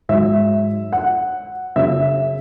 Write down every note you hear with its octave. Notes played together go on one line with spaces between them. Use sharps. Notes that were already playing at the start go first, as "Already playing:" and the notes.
G#2 F#3 E5
F#5
F#2 C#3 F#3 E5